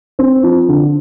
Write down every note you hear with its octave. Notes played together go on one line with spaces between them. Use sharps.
C4
F3
D3